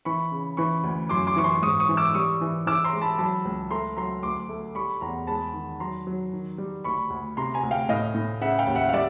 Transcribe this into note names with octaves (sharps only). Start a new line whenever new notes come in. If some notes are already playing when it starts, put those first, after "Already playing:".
E3 B5 C#6
C#3
E3 B5 C#6
D2
F#2 C6 D6
C6 D6
E3 C#6
C6 D6
G#2 C#6 D#6
C#6 D#6
E3
D6 E6
G3 C#6 D#6
E3
E3 D6 E6
A#5 C6
G#3
A5 B5
F#3 A5 B5
C#2
A3 A#5 C6
F#3 A#5 C6
D2 C6 D6
A3
G3 B5 C#6
E2 A#5 C6
G#3 A5 B5
D#3
F#3 A#5 C6
F#3
D#3
G3
D2 B5 C#6
D2
C3 A#5 C6
G#5 A#5
D2
F5 G5
A2 D#5 F5
A2
C#3 E5 F#5
F5 G5
D#2
E5 F#5
F5
G3 D5 E5